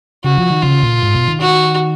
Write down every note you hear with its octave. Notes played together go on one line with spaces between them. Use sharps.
C#3 F#4
F3
D#3
C#3 F4
A#2
G#2
B2
D#3
F#4